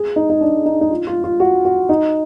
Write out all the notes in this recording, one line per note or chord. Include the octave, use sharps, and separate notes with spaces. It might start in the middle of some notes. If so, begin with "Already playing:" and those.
Already playing: G#4
D#4
D#4
D4
D#4
D#4
F4
F4
F4
F#4
F#4
D#4